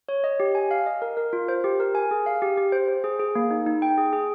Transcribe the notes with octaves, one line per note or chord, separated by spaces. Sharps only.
C#5
D#5
G4
G#5
F5
D#5
A#4
A#4
F4
C5
G4
A#4
G#5
G#4
F5
G4
G4
C5
C5
G#4
G#4
A#3
D#4
D#4
G5
G#4
G#4